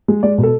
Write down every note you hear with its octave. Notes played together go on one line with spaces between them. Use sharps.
G#3
G#3 D5
B2
A4